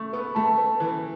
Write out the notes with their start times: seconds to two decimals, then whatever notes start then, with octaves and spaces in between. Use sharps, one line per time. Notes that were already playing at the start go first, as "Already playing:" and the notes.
Already playing: A3 C#6
0.13 B3 B4
0.35 A3 A5
0.58 B4
0.80 E3 B4